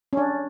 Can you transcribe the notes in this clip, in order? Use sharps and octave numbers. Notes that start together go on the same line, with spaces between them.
C#4
D4